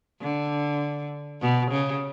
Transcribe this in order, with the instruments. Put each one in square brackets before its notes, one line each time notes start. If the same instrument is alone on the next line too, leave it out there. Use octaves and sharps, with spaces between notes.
[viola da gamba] D3
B2
C#3